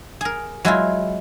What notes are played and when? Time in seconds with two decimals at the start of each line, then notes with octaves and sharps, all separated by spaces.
0.21 G#4 A#4
0.65 F#3 G#3 E4 F4